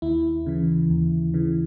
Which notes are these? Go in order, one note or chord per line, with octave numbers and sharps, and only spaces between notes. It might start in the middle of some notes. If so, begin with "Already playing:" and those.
D#2 E4
C#3 E3
D#2
C#3 E3